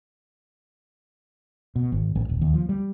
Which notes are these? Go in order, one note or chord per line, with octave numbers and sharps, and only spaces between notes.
B2
G#1
A1
D#1
D#2
F3
G3